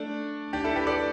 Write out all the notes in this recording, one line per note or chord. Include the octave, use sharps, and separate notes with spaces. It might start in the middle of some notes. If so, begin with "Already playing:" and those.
Already playing: A3 D4
D4 G4
E4 A4
G4 B4
A4 D5